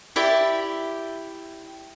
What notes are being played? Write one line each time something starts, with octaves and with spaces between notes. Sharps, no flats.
E4 G4 D5 E5